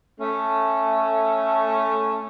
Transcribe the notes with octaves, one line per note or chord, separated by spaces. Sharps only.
A3 C#4